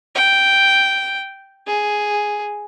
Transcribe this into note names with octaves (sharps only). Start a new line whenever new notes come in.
G5
G#4